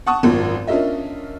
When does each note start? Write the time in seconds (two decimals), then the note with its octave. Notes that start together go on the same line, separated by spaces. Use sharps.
0.06 F#5 A5 C#6 D#6
0.23 G#1 F#2 F3
0.67 C#4 D4 F4 A#4 D#5 E5